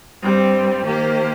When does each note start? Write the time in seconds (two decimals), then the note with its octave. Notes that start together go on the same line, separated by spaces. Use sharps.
0.23 G2 G3 C4
0.84 D#3 A#3 G4 C5